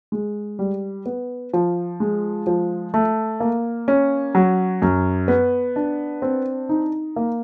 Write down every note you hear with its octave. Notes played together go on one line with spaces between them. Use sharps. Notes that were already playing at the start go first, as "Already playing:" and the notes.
G#3
G3
B3
F3
G#3
F3
A3
A#3
C#4
F#3
F#2
B3
D4
C4
D#4
A#3